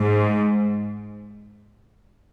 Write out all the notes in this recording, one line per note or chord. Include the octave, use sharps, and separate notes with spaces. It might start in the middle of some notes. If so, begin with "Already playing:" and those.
Already playing: G#2